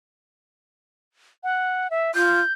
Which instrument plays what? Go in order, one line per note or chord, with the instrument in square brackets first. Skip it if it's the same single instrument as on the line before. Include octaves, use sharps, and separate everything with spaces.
[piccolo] F#5
E5
[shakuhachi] F4 [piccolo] G6